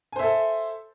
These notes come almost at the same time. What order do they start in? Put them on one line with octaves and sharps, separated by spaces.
G#5 C5 E5 A4